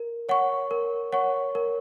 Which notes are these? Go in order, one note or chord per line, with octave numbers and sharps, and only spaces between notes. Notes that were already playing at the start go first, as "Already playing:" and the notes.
Already playing: A#4
C#5 F#5 C#6
A#4
C#5 F#5 C#6
A#4